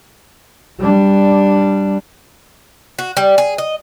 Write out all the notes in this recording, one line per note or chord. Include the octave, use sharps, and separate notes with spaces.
G3 D4
F#4
G3
G#4
D#5